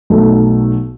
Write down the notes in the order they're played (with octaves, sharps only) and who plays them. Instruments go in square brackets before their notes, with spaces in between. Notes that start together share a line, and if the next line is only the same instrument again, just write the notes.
[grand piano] B1 B2 A3 D#4 A4